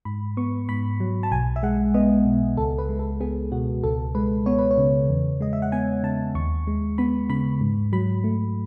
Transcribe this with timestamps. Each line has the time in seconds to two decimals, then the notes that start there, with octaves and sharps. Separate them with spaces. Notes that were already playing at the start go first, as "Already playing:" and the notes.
0.05 G#2 B5
0.37 B3 C#6
0.69 G#2 B5
1.00 F#3
1.23 A5
1.32 B1 G#5
1.56 E5
1.63 G#3 F#5
1.94 B3 D#5
2.26 B2
2.57 C#2 A4
2.78 B4
2.89 G#3
2.99 A4
3.20 B3 G#4
3.52 B2 F#4
3.83 C#2 A4
4.15 G#3 B4
4.46 B3 C#5
4.58 B4
4.71 C#5
4.78 C#3
5.09 E2
5.41 G#3 D#5
5.53 E5
5.62 F#5
5.72 B3 G#5
6.03 C#3 A5
6.35 D#2 C#6
6.67 G#3
6.98 B3 B5
7.29 C#3 B5
7.61 G#2
7.93 F#3 B5
8.24 A3